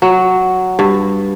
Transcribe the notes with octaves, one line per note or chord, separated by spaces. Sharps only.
F#3
G2